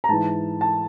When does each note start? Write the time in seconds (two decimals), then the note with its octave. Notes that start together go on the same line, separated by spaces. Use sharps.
0.04 A#5
0.09 G#2 E3 A5
0.61 A5